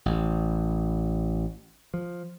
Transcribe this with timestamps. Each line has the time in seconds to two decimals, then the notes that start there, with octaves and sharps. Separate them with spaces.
0.06 A1
1.94 F3